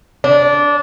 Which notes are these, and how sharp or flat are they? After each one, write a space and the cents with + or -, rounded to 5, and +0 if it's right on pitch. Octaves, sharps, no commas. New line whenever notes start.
D4 -15